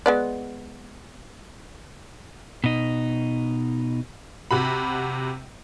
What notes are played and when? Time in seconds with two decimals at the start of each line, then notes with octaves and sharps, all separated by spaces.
0.06 G#3 B3 D5
2.64 B2 D#4
4.51 C3 F#4 B5